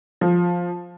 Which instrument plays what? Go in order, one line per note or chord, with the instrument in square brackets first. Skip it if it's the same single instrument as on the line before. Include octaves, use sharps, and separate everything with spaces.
[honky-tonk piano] F3